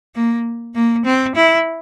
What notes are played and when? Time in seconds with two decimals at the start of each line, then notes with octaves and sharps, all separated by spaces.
0.15 A#3
0.75 A#3
1.05 C4
1.35 E4